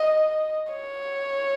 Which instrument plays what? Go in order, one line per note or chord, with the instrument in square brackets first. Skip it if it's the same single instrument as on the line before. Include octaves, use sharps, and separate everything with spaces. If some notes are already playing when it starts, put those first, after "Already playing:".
Already playing: [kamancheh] D#5
C#5